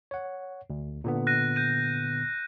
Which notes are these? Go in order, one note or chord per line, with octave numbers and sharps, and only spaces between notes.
C#5 F#5
D2
A#2 D3 B3
F#6 A#6 D#7
G6 D#7